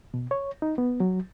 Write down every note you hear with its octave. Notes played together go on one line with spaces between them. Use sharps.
B2
C#5
D#4
B3
F#3